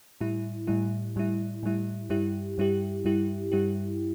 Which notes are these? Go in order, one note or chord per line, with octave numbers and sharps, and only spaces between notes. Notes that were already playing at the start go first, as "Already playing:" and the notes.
A2 G3 E4
A2 G3 E4
A2 G3 E4
A2 G3 E4
G2 G3 E4 G4
G2 G3 E4 G4
G2 G3 E4 G4
G2 G3 E4 G4